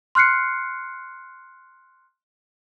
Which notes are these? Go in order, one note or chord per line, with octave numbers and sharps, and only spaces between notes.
C6 F6 F#6 C7 C#7